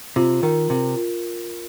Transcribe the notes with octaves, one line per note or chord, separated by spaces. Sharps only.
C3 F4
D#3 A#4
C3 A#4
F4